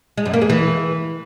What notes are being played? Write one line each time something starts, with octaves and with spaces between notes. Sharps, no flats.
G#3
F#2
A#3
G#3
E3